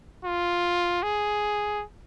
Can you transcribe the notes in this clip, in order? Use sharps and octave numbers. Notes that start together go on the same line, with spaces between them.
F4
G#4